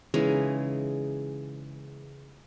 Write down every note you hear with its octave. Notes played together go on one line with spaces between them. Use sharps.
C#3 E3 G#3 D#4